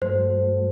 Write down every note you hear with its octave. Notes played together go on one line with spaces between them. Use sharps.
G2 F#3 A3 C5